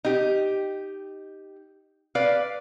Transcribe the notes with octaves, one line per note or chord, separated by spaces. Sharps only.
D#4 G4
B4 D5 F5